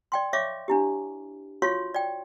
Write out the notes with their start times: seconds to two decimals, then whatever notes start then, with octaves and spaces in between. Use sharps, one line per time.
0.12 D5 G5 C6
0.33 C#5 E5 F5 C#6 D6
0.68 D4 E4 G4
1.62 F4 F#4 C#5 F5 C6 C#6
1.94 D5 G5